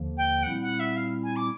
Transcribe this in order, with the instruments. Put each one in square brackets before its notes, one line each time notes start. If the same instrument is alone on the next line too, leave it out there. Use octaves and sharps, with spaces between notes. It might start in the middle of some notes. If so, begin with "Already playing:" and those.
Already playing: [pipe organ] D#2 D3 F3 A#3
[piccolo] G5
[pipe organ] A#2 G3 C4 E4 [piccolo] F#5
[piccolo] F#5
E5
F5
G#5
D6